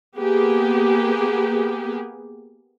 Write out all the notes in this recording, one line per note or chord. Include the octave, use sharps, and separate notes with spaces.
A#3 B3 G4 G#4